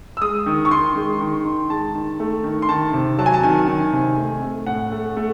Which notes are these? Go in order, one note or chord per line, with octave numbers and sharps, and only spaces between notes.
E6
G#3 D#6
D#3
C#6
D#3 C6
G#3
D#3
D#3
G#3 A5
D#3
A3
D#3
C6
D#3 A5
C3
F#3 A5
G#5
A5
D#3 G#5
D#3
C3
A3
A3
A2 F#5
A3
A3